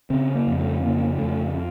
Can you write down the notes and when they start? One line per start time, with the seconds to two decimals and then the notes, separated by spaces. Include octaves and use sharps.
0.10 C#3 C4
0.35 A#3
0.47 F2
0.59 A3
0.83 C#3 A#3
1.19 F2 A3